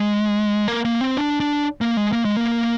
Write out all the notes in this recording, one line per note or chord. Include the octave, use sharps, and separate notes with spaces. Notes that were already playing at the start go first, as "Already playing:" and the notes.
Already playing: G#3
A#3
A#3
C4
D4
D4
A#3
G#3
A#3
G#3
A#3